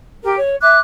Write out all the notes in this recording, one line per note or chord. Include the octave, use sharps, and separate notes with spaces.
G4 A#4
C#5
E5 D6 F#6